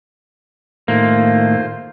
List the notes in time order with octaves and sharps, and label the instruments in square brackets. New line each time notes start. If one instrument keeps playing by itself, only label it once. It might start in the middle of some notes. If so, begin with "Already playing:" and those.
[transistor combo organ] A2 D#3 A3 [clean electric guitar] A#3 [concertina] F4 C5